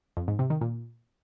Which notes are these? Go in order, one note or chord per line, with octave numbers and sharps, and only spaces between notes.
F2
G#2
C3
D#3
A#2